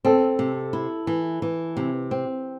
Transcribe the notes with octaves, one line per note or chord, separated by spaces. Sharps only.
C4 A4
C3
E4
E3
E3
C3
C4